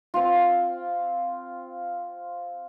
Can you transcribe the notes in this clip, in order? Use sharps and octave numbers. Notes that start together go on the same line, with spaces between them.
C4 F4